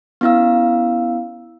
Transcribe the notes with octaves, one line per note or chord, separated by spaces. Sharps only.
B3 C#4 E4 F5 E6